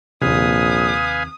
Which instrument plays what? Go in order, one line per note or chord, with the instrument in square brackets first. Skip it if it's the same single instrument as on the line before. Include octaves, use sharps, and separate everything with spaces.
[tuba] A#1 [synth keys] D#2 C3 [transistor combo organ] B4 F5 G#5 [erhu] D#6